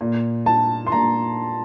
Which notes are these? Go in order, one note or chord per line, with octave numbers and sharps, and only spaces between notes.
A#2
A5
C6
A#2 A#5